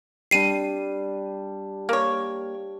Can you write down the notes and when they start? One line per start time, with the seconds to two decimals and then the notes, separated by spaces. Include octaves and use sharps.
0.31 G3 D4 C7 D#7
1.89 A#3 C#5